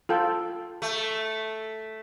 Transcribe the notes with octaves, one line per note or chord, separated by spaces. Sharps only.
F4 A4 G5
A3